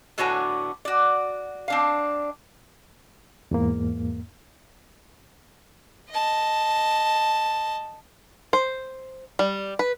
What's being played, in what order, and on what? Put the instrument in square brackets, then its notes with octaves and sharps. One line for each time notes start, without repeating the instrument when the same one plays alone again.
[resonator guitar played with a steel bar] A2 D3 B3 F#4 C#5 G#5
F#4 D5
C4 D4 F5
[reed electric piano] E2 G#2 A#3
[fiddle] D#5 A5
[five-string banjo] C5
G3
B4